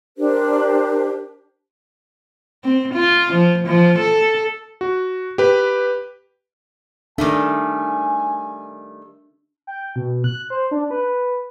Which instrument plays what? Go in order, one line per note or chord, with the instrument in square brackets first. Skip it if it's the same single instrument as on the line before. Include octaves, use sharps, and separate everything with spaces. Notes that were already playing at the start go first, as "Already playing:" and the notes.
[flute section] D4 G4 A#4 C5
[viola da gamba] C4
F4
F3
F3
A4
[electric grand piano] F#4
G4 B4
[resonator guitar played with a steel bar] D#3 G3 A3 [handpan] D4 [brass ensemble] G#5
[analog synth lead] G5
B2
F#6
C5
D4
B4